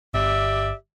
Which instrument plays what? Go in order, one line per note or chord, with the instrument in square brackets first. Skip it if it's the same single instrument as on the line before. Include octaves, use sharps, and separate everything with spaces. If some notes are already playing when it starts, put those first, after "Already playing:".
[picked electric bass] G1 [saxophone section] G4 D5 E5